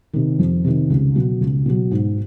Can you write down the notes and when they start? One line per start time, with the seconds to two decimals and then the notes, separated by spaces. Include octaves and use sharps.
0.13 C3 D#3
0.39 F2
0.64 C3 D#3
0.90 C#2
1.15 B2 F#3
1.41 C#2
1.66 B2 F#3
1.91 G#2